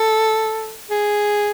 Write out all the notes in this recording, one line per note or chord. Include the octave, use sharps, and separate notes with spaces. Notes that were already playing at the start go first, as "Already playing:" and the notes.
Already playing: A4
G#4